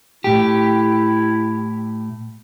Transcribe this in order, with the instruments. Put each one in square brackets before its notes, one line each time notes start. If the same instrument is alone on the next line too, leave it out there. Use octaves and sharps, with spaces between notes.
[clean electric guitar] A2 G4 [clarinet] E4